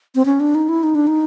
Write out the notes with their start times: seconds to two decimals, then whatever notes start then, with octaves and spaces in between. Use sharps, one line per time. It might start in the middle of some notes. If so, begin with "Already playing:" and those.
0.15 C4
0.25 C#4
0.40 D4
0.55 D#4
0.69 E4
0.83 D#4
0.95 D4
1.07 D#4